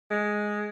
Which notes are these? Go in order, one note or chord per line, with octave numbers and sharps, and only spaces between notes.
G#3